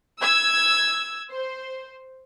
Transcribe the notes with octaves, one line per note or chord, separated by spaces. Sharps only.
E6 G#6
C5